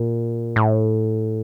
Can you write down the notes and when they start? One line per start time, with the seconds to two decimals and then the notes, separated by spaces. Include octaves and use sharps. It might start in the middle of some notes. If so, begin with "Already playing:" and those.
Already playing: A#2
0.56 A2